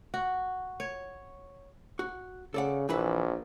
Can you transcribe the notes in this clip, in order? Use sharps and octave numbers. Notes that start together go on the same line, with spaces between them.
F#4
C#5
F#4
C#3 A4 D5 F#5
A#1 E3 E4 B4